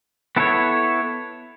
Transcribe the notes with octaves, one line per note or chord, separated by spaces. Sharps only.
B3 E4 A4 C#5